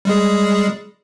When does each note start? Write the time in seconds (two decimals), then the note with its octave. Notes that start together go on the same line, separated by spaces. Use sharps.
0.05 G3 G#3 G#4